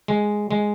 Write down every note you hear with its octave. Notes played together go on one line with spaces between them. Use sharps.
G#3
G#3